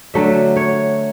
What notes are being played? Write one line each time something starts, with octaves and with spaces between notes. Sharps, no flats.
D3 F#3 A3 E5
C#5